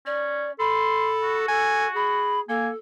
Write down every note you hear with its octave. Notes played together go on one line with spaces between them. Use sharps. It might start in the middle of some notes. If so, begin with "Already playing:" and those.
C#4 D5
A4 B5 C6
F#4
A4 G#5
G#4 B5
A#3 A4 G#5